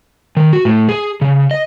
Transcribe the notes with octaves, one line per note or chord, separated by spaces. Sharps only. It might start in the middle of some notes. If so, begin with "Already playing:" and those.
D#3
F#4
A2
G#4
C#3
D#5